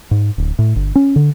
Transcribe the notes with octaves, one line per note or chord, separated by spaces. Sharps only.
G#2
D1
A2
G1
C#4
D3